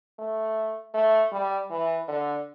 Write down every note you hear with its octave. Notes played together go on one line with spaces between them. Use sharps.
A3
A3
G3
E3
D3